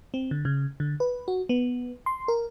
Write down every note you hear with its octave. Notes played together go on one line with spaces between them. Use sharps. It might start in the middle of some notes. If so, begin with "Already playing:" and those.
C4
D3
C#3
D3
B4
F#4
B3
C6
A#4